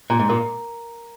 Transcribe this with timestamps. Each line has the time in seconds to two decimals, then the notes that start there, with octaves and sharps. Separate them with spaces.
0.10 A#2 A#5
0.19 G#2
0.29 A#2 A#4